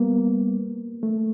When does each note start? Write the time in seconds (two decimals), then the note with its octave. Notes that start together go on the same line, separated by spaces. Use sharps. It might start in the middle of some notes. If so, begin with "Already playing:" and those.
Already playing: G3 A#3 B3
1.03 A3